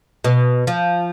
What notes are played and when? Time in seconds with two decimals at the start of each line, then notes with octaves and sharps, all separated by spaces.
0.24 B2
0.67 F3